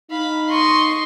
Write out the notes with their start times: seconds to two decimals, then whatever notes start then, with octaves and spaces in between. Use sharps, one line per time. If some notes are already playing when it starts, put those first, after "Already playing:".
0.10 D#4 F5 B5
0.50 D#5 C6 C#6